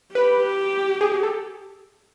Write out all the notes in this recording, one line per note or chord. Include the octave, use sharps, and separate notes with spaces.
G4 B4
G#4
G#4
A4